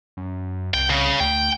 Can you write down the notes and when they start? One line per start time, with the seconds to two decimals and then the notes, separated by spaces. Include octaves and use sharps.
0.17 F#2
0.74 C2 G5
0.90 C#3
1.20 D2 G5